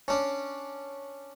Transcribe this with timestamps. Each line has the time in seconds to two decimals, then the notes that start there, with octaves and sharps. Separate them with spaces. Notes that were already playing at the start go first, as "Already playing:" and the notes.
0.08 C#4 D4